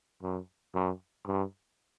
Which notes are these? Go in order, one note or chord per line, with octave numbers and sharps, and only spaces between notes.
F#2
F#2
G2